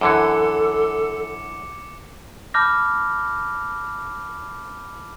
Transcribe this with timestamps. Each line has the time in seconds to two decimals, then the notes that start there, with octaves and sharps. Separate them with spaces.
0.01 F#2 D3 E3 A4 D6 C#7
2.54 A5 B5 D6 F6 G6 A#6